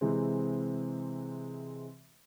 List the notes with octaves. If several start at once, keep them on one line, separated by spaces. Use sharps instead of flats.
C3 E3 G#3 C4